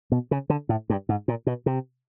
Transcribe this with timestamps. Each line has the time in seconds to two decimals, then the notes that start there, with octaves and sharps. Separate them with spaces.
0.12 B2
0.31 C#3
0.50 D3
0.69 A2
0.90 G2
1.09 G#2
1.28 A#2
1.47 B2
1.66 C3